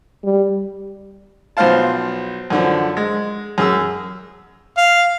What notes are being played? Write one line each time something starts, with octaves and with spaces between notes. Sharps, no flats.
G3
B1 F3 C5 F5 A5
F#2 D3 F3
G#3
F#2 G#4 E6
F5